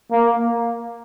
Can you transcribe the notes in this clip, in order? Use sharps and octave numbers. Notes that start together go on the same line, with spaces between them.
A#3